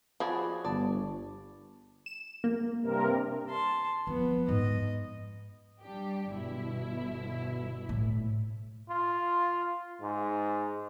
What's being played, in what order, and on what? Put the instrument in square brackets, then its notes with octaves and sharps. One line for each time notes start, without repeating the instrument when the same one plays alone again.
[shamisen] F3 [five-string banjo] F#4 G#4 D5 [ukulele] B5
[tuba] G1 [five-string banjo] D5 [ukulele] A5
[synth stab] E7
A#3
[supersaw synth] G2 C3 A#4
[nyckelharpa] A5 C6
[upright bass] F3 [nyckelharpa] B3
[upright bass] G#2 [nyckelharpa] D#5
[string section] G3 D4 G4
G1 B2 E4
[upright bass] A2
[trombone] F4
G#2